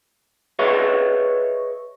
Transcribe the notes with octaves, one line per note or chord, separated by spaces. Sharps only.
G#4 B4 C#5 D#5 E5